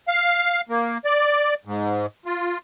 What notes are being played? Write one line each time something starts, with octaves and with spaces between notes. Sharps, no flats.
F5
A#3
D5
G#2
F4